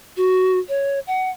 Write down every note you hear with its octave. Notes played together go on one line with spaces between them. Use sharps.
F#4
C#5
F#5